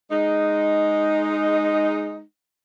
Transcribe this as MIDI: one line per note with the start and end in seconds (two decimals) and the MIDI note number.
0.11 2.22 56
0.11 2.22 63